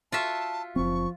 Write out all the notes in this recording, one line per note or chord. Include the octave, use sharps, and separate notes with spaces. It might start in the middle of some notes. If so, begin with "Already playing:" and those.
F4 F#4 E5 A5
F#1 F3 C4 C#6